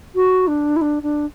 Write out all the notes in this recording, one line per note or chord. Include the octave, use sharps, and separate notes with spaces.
F#4
D4
E4
D4
D4